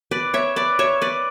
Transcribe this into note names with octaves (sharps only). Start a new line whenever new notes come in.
B4 D5
C#5 E5
B4 D5
C#5 E5
B4 D5